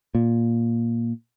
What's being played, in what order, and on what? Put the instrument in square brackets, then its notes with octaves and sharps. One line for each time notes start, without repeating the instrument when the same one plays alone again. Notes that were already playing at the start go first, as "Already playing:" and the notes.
[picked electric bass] A#2